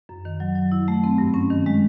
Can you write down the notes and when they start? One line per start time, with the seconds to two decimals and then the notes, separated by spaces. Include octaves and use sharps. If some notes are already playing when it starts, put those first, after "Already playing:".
0.09 F#2
0.25 D#3
0.40 F#3
0.55 F#3
0.72 E4
0.88 A3
1.04 C4
1.18 G2
1.34 C#4
1.50 D#3
1.66 G#3